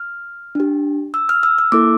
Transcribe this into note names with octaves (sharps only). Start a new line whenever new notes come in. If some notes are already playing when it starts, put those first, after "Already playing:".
Already playing: F6
D4 G4
E6
F6
E6
E6
A#3 E4 A4 D6